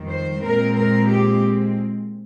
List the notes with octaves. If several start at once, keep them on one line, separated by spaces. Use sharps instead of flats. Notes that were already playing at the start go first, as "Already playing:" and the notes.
Already playing: F2 D#3 G3
C5
A#2 G#3 C4 A#4
A#4
G4